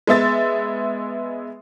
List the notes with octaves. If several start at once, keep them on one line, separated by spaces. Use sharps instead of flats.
G#3 B3 E5 A6